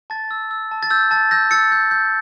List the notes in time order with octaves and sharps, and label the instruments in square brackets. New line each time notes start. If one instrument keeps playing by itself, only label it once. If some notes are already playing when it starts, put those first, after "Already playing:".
[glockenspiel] A5 A6
E6
E6
A5
A6
E6 G6
A5 A6
E6 G6 A#6
E6 A6 C#7
G6
G6